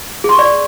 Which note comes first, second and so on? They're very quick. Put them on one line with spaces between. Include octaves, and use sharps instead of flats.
G#4 C6 C#6 D5